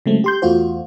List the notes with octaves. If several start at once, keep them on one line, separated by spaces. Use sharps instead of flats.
C#3 F#3 G#3 A3 C4
G4 C6 G6
E2 A3 F4 F#4 C5